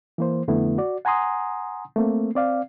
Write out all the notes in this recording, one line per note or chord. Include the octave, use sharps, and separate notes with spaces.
E3 A#3 C5
F2 D3 A3 B3 E4
F#4 D5
F#5 G#5 A#5 C6 D#6
A3 A#3 C4
C4 D5 F5